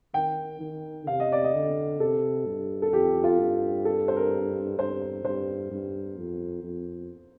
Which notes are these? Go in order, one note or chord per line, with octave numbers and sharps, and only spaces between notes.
D#3 G5
D#3
C3 F5
D#5
D5
D#5
D3
C3 A4
G2
A4
F2 G4
F4
G2
A4
C5
A#4
G2 C5
G2 C5
G2
F2
F2